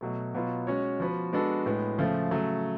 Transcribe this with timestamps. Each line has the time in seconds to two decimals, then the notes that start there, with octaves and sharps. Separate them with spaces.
0.01 B2 F#3 A3
0.34 B2 F#3 B3 F4
0.67 G#3 C#4 F#4 C#5
1.00 F3 B3 F#4 B4
1.33 G#3 B3 D4 F#4 A4
1.66 A2 G#3 B3
1.98 C#3 F3 A3 F4
2.31 C#3 F#3 A3